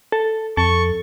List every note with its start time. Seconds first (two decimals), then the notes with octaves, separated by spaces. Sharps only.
0.12 A4
0.57 F2 A4 C#6